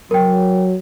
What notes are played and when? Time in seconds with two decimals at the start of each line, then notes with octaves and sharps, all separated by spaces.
0.11 F#3 A#4 G5